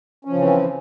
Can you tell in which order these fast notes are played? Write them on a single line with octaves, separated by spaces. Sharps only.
C#4 F3 C#3 E3 C4